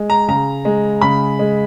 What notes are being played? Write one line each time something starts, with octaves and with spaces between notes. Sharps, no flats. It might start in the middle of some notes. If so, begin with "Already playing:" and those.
Already playing: G#3
A#5
C#3 A#5
G#3
C#3 B5
G#3